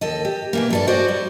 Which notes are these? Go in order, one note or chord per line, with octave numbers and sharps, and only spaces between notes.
D#2 A4 D#5
G4
B2 E3 A#3
G2 A4 D5
F#4 C5 D5 D#5
G3